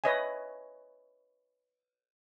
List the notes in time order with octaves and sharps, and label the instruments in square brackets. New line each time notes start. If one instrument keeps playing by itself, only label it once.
[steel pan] B4 C#5 D#5 E5 G#5